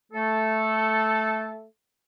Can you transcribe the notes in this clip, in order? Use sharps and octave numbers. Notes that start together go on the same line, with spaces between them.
A3 A4